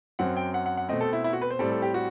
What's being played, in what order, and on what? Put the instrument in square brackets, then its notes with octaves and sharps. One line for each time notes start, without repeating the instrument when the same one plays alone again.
[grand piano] F#2 F#3 C4 F#5
G5
F#5
F#5
F#5
B2 A3 C4 D#5
A4
E4
E4
F#4
B4
C5
A2 G3 C4 A4
A4
G4
F#4